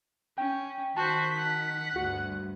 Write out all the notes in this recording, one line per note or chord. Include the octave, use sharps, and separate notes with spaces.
C#4 G5
D#3 F#4 C5 A5 B6
F#5
D2 G2 F#4